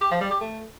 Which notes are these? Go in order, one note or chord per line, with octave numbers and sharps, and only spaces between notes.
G4
F3
G3
G4
A3